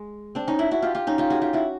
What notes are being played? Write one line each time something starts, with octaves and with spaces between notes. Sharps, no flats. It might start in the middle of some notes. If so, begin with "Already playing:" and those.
Already playing: G#3
C4 D4
C#4 D#4
D4 E4
E4 F#4
F4 G4
F4 G4
C#4 D#4
F4 G4
F#4 G#4
F4 G4
E4 F#4